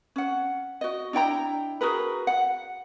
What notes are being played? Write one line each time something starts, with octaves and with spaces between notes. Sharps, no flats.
C#4 F#5
F#4 D#5
D4 E4 G5 A#5
F#4 G#4 A#4 B4
F#5